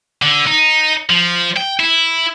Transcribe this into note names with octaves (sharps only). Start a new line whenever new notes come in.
D3
D#4
F3
G5
E4